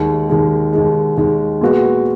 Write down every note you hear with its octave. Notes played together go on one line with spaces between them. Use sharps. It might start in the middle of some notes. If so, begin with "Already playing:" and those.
Already playing: D#2 D#3 G#3
D#2 D#3 G#3
D#2 D#3 G#3
D#2 D#3 G#3
A#2 G#3 B3 F#4